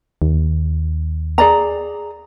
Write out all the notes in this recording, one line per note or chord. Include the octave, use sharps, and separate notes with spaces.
D#2
G#4 D5 A#5